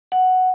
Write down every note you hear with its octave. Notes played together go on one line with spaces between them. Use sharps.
F#5